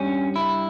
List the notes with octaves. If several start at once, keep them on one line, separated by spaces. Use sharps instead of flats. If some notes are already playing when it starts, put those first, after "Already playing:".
Already playing: G2 G3 C#4
E4